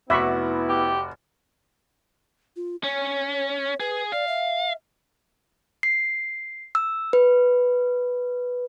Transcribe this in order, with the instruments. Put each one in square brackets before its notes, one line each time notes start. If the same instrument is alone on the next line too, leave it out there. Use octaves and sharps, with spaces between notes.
[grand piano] F1 F#4 D6 [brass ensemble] B3 E4 [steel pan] E5 B5 C#6
[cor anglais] G4
[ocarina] F4
[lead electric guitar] C#4 [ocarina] C#5
[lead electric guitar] G#4 [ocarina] B4
[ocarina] D5 [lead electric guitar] F5
[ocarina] E5
[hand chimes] C7
E6
B4